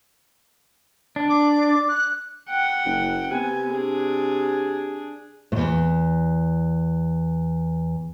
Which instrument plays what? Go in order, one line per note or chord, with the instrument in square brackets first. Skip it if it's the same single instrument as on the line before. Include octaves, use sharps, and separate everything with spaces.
[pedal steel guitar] D4
[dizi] D6
F#6
[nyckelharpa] F#5 G5
[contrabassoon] F#1
[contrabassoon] C3 [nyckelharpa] B3 G#5
[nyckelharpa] D4 G#4
[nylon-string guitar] E2 G2